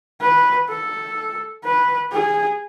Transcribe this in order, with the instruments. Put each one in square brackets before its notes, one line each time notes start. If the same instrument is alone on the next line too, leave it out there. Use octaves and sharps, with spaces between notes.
[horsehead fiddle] B4
A4
B4
G#4